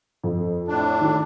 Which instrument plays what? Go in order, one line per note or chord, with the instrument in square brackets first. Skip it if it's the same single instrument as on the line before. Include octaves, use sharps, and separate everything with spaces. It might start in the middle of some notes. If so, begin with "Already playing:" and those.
[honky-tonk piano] F2
[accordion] A2 D4
[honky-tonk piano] D#3